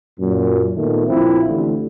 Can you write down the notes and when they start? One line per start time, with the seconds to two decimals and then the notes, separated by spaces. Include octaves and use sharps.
0.20 F#2 A#2
0.76 A#2 D#3 A3 B3
1.07 A#1 C4 E4 F4
1.48 A1 D3